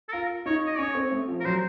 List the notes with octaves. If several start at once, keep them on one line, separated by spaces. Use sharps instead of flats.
A4
F4 A#4
D#4 C#5
D#5
C#4 C#5
C4
A3
F3
A#4
F#3 C5